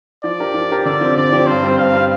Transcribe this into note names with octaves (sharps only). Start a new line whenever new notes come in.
F3 D5
D4 G4 A#4
F3
D4 G4 A#4
D3 D5
F3 C4 G4
D3 D5
F3 C4 G4
G2 C5
G3 C4
G2 F5
G3 C4